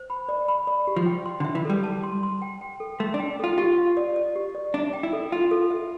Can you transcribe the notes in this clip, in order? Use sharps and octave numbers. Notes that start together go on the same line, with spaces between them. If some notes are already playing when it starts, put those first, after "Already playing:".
Already playing: C5
B5
D5
B5
D5
G4
F3
G5
C6
D3
E5
E3
G3 A4
A5
C6
C6
G5
G5
A4
A3 C6
D4
G5
F4 A4
F4 G4
F5
D5
D5
G4
D5
D4 E5
G5
E4
A4
F4 E5
A4
E5